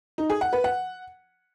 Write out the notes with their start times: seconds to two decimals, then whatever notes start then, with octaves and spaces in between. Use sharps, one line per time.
0.18 D#4
0.30 G#4
0.41 F#5
0.53 B4
0.64 F#5